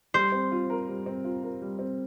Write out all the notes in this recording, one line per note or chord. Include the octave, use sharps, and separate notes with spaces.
G3 C5
C4
F4
A#4
G3
C4
F4
A#4
G3
C4